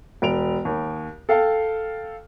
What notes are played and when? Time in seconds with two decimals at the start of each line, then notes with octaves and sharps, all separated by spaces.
0.22 E1 D7 F7
0.65 D#2
1.29 A4 F5 G5 A5